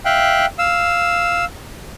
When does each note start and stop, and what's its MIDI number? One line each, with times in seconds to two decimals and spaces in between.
0.05 0.46 76
0.05 0.46 77
0.05 0.46 79
0.05 0.46 90
0.59 1.45 77
0.59 1.45 88